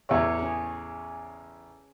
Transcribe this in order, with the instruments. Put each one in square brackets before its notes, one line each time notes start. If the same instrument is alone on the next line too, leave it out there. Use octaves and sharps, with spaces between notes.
[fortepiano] A1 E2 [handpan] C#5
[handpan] C#4 G#4